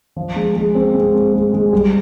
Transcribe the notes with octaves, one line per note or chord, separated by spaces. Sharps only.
F3
G#3
G#3
C4
G#3
C4
G#3
G#3
G3